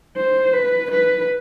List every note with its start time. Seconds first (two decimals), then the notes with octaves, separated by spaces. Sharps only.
0.16 C5
0.53 B4
0.91 B4